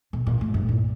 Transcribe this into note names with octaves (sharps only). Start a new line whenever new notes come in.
B2
A#2
A2
G2
A#2